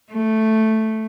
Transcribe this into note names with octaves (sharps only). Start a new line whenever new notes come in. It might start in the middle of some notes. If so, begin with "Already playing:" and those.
A3